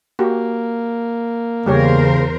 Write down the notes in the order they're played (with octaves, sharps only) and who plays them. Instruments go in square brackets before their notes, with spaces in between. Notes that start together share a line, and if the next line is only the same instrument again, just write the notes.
[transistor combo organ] A#3 [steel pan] F#4 G4
[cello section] E2 A#4 C5 [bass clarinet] C#3 [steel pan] G3 G4 C#5